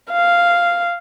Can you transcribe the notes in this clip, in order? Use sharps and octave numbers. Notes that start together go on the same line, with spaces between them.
F5